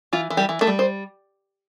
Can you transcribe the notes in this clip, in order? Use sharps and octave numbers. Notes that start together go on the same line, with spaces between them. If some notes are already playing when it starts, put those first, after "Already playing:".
E3 F4
E3
G3 G4
E3
A3 A4
G3
C5